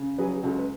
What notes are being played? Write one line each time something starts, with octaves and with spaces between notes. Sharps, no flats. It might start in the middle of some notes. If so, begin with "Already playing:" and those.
Already playing: C#3
F#3 G#4 B4
G#4
C#2 F#4 A4
B4